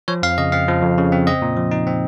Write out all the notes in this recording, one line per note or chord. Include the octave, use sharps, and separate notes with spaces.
F3 C#5
F2 F5
C#3 D#5
C4 F5
F3
F2
C#3
C4
C4 D#5
A#2
F3
D#4
C4